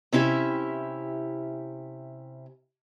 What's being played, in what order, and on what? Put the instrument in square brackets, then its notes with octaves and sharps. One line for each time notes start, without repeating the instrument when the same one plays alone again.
[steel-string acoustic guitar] C3 C#4 E4 G4 E5